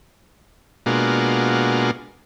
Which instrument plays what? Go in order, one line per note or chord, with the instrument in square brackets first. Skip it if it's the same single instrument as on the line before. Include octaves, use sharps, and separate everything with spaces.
[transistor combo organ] B2 G#3 A#3 D4 F4 F#4